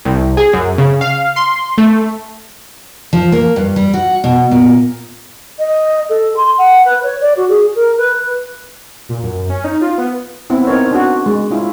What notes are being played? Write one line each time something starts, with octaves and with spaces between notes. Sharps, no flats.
C2
G#4
F#2
C#3
F5
C6
A3
F3
A#3
G2
G3
F#4
B2
A#2
D#5
A4
C6
F#5
B4
C#5
D5
F#4
G#4
A#4
B4
A#2
F#2
C#4
D#4
F4
B3
B3 C4 E4
C4 D#4 A#4 C#5
D4 F#4
G#3
C#4 E4 F4